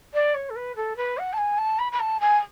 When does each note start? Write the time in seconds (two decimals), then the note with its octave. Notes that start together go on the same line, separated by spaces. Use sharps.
0.13 D5
0.34 C#5
0.49 A4
0.55 B4
0.75 A4
0.96 B4
1.17 F#5
1.32 A5
1.37 G#5
1.57 A5
1.78 B5
1.92 B5
1.99 A5
2.20 G#5